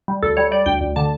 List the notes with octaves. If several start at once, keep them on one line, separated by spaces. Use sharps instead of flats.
G3
D2 A4
G3 C#5
G3 D5
D2 G5
D2
D3 A5